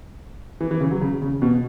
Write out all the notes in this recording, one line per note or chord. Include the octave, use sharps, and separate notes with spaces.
E3
E3
C#3
F#3
C#3
C#3
B2